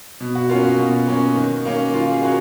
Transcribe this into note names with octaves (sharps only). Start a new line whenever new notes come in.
B2
F#4
A#3 C#4 F4
F#4
B2
A#3 C#4
D#3
A#3 C#4
D#3 F4
G#4
A#3 C#4 F#4